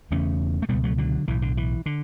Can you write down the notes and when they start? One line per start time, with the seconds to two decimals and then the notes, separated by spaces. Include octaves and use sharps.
0.11 E1 E2 C#3 A3 C#4
0.62 A3
0.69 C#2 B2 G3 B3
0.84 F#3 A3
0.98 D3 F#3
1.28 B1 A2 E3
1.42 D3
1.57 E3
1.86 D3